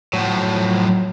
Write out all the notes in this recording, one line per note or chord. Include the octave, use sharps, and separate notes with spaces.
A2 F3 F#3